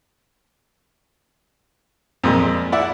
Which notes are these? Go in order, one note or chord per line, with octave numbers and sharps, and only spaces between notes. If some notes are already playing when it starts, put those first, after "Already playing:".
F2 A#2 G#3
E4 D5 F#5